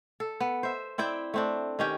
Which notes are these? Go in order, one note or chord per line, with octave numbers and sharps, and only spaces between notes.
A4
B3
C5 E5
C4 E4 D5 G5
A3 C4 D4
D#3 C#4 G4